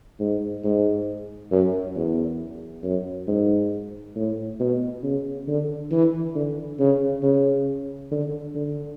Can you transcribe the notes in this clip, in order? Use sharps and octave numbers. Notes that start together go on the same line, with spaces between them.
G#2
G#2
F#2
E2
F#2
G#2
A2
B2
C#3
D3
E3
D3
C#3
C#3
D3
D3